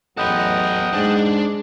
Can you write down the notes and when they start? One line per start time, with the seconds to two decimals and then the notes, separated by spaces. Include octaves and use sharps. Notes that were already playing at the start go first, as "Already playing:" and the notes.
0.18 A1 E2 F#3 A4 B4 D#5 F#5 G5
0.93 G#2 G#3 D4